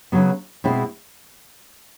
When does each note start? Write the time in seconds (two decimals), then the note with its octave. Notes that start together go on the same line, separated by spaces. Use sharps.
0.12 C#3 F#3 B3
0.64 B2 G#3 C4 E4